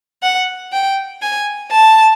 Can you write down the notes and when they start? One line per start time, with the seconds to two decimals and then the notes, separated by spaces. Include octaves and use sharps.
0.23 F#5
0.72 G5
1.22 G#5
1.72 A5